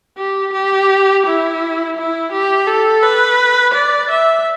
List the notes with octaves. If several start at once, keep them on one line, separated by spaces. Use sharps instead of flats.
G4
G4
E4
E4
G4
A4
B4
D5
E5